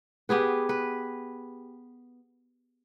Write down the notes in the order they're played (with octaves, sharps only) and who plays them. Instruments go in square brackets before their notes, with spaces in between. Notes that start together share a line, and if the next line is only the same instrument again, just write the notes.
[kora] B3 G4 G#4 B4
B4